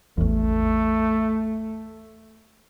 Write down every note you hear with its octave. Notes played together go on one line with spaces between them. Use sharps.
A1 E2 A3